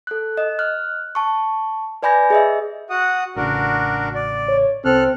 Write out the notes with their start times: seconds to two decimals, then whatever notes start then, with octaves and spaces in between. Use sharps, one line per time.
0.07 A4 F#6
0.37 D#5
0.59 F6 F#6
1.15 A5 C#6
2.03 B4 D5 G#5 B5 G6 A#6
2.30 G#4 D#5 E5
2.90 F#4 F#5 D#6
3.36 A1 C#3 D4 F#4 A#4
4.15 D5
4.48 C#5
4.85 C2 C4 A4 F6 F#6